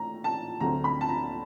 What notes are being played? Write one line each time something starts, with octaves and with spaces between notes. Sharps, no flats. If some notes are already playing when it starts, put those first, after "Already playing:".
Already playing: A2 A#5
A5
D2 D3 F#3 A3 C4 A#5
B5
A5
A#5